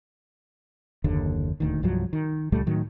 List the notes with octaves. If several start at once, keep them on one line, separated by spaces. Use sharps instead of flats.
F#1 D#2 D3
D#1 D2 D#3
C2 G2 F3 F#3
D#3
C#2 A#2 G3 A3
A2 D#3 F#3